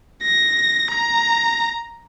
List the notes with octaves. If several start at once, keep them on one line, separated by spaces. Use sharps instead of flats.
A#6
A#5